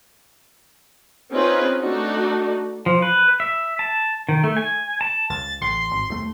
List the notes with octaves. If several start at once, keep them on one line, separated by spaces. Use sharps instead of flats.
C4 C#4 D#4 F4 G#4 B4
A3 D4 D#4 F#4
F3
B4
E5
A5
D#3
A3
G#5
A5
C#2 A6
A1 C6
G#1
D#2 A3